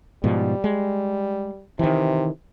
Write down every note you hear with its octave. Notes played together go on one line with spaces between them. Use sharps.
G#2 B2 F3 G3
G#3
C3 D#3 E3